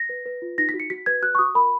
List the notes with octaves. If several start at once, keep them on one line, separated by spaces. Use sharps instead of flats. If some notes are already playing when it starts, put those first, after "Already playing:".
Already playing: A#6
B4
B4
F4
D#4 A#6
B6
F#4
C#7
F#4 B6
B4 G#6
F#4 F#6
C#6
F#4 D#6
A#4 B5